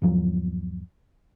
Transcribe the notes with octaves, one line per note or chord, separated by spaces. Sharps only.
G1 D#2 F3 F#3